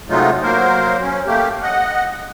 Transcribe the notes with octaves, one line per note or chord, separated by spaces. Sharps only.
C3 F#3 G#3 A3 D#4 F4
F#3 A#3 A#4 C5
C#4
A3 A#3 G4
D#5 F#5